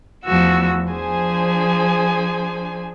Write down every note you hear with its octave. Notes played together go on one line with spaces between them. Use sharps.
E2 F3 A3 B3 F#4 E6
F3 D4 G#4 C5 G#5